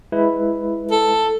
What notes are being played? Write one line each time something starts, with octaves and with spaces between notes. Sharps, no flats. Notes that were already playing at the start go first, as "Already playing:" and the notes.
G#3 E4 B4
A4